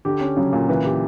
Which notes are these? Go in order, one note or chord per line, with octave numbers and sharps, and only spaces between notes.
D3 G4
C#4
C#3 F#3
A#2
E3 B4
G4